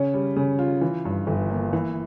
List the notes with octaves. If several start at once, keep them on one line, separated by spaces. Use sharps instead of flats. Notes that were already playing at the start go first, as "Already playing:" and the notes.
Already playing: C#3 C#4
G3
C#3
F4
E3
G2
G1
A#3
E3